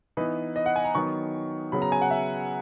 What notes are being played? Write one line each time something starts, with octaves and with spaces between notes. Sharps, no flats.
E3 B3 D#4 B4
D#5
F#5
G#5
A#5
D#3 F#3 B3 C#6
C#3 F#3 B3 B5
A#5
G#5
F#5
E5